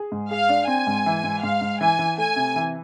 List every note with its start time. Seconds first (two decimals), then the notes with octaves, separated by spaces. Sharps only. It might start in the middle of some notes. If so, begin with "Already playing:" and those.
Already playing: G#4
0.12 G#2
0.31 G#4 F5
0.49 D4
0.68 C4 G#5
0.87 G#2
1.06 E3
1.24 G#2
1.43 G#2 F5
1.61 G#2
1.80 E3 G#5
1.99 E3
2.18 A3 G#5
2.36 C3
2.56 E3